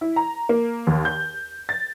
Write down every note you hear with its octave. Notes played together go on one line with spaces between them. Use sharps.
E4
A#5
A#3
D#2
G6
A6